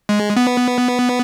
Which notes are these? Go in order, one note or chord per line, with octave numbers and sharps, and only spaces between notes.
G#3
B3